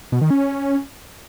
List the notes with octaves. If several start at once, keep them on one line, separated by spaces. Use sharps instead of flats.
B2
D#3
C#4